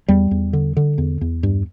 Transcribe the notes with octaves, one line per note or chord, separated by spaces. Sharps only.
E2 G3
E2
D3
D3
E2
E2
G2